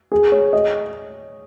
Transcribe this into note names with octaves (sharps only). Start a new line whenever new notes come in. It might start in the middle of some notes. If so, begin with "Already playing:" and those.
G#4
C#5
D#5